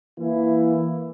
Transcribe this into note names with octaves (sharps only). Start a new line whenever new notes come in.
E3 A#3 E4